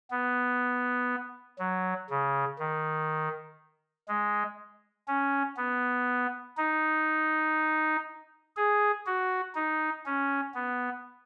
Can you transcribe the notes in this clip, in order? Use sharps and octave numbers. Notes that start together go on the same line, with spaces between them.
B3
F#3
C#3
D#3
G#3
C#4
B3
D#4
G#4
F#4
D#4
C#4
B3